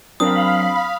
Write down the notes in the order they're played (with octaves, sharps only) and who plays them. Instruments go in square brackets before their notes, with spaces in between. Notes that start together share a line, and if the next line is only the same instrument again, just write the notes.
[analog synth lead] F#3 [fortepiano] C4 D4 A#4 [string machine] F5 B5 [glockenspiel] D#6